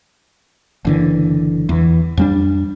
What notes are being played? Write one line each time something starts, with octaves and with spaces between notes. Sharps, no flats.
F#1 D3 E3
E2 E3
F2 G3 D4